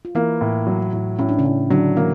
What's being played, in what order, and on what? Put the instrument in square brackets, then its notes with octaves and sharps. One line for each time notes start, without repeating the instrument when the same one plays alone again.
[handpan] F4
[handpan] E3 E4 [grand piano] A#3
[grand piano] A2
F#3
A2
[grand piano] A2 [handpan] C#4
[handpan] D4
C#3 C#4
[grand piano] A2
[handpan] D3 D4 [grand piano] F#3
[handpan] E3 E4 [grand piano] A#3